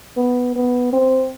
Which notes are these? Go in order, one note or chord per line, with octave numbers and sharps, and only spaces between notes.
B3
B3
C4